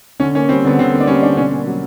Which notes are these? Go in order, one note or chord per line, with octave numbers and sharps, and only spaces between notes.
D3 C#4
A#3 C#4
G3 C4
D3 B3
D3 C4
A#3
D4
G3 C#4
D3 D4
B2 C#4
A#3
F#3